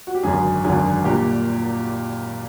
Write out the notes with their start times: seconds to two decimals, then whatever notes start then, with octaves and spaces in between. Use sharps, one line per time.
0.07 F#4
0.15 G4
0.23 G#1 F#2 D3 G#4
0.64 G#1 F#2 D3 G#4
1.04 A#2 G3 A#3 G4